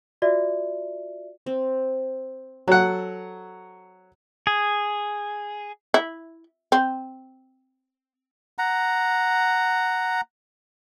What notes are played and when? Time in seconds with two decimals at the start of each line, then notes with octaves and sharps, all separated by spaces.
0.22 F4 F#4 D5 E5
1.46 C4
2.68 F#3 A4 F#5
4.47 G#4
5.94 E4
6.72 C4
8.58 F#5 A#5